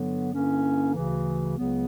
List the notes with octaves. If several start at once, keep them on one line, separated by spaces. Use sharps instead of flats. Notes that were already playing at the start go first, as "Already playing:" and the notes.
Already playing: G2 D3 F#3 B3
G2 D3 A#3 C#4 E4
D2 C#3 E3
C#2 C#3 F#3 B3